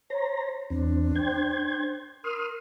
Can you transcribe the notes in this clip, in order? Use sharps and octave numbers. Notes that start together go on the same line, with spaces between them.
C5 C#5 A#5
E2 C4 D4
C5 G5 G#6
A#4 C6 D#6 F6